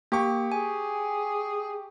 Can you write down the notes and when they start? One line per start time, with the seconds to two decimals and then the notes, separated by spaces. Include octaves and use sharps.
0.12 A#3 G4 C#6
0.52 G#4 G#5